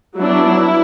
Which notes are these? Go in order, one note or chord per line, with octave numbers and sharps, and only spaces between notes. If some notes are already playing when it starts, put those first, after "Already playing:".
F#3 B3 D4 E4